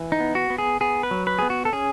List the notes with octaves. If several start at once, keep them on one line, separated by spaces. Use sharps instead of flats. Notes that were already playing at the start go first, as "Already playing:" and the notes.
Already playing: E3
D#4
B3
F#4
B3
G#4
B3 G#4
B4
F#3
B4
B3 G#4
F#4
A4
C#4 G#4